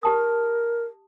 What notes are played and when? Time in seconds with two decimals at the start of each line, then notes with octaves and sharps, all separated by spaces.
0.03 G4 A#4 A5 D#6